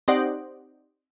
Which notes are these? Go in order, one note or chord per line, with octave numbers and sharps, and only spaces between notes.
C4 D#4 G4 C5 D5 F#5